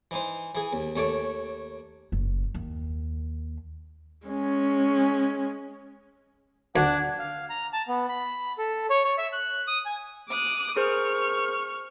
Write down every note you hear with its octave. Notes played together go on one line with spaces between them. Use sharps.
E3 D#4 C5
E3 G#4
D#2
D#2 A3 C#5 D5 D6
F#1
D#2
G#3 C#4
D2 D4 F#5 G#6
F5
A#5
A5
B3
B5
A4
C#5
C#5
E5
F#6
D#6
G#5
D6 D#6 F#6
G#4 A#4 C5 C#6 F6